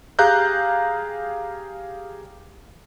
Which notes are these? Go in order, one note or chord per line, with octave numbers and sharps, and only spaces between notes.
G4 G#4 F5 A#5 F#6 G6